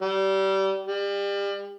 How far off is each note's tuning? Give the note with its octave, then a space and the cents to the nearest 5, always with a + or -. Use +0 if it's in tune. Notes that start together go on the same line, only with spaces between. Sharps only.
G3 -25
G3 +30